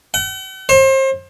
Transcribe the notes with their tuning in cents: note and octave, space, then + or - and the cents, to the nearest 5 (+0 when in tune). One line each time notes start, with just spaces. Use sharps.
F#5 +45
C5 +35